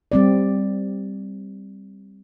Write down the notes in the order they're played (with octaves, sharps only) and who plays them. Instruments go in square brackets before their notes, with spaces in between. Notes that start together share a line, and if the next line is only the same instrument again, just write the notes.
[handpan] G3 C4 D5